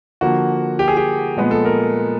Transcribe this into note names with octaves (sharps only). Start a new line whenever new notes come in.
D3 F3 A#3 F#4
G4
G#4
G4
A#2 F3 G#3 B3
A4
A#4